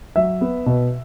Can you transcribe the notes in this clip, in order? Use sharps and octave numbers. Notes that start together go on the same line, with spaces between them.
F#3 E5
B3
B2